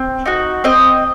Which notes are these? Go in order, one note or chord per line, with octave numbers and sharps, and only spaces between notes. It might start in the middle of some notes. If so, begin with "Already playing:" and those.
Already playing: C4
D#4 F#4
C4 D#5